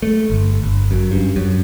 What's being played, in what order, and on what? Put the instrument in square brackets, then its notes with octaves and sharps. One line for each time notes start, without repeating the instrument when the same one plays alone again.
[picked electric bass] A3
G1
G1
F#2
G2
F#2